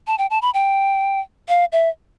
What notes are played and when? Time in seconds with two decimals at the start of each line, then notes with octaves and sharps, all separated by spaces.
0.07 A5
0.18 G5
0.30 A5
0.42 B5
0.54 G5
1.48 F5
1.72 E5